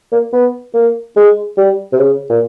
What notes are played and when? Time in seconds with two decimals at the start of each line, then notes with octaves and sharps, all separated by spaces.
0.12 A#3
0.33 B3
0.74 A#3
1.16 G#3
1.57 G3
1.92 C3
1.99 C#3
2.30 A#2